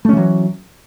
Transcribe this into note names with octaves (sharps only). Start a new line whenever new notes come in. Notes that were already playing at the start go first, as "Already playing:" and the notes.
E3 F#3 A3 C#4